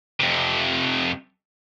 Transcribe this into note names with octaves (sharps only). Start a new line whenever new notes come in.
F2 C3